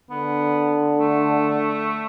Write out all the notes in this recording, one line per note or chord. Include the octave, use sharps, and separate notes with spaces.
D3 B3
A3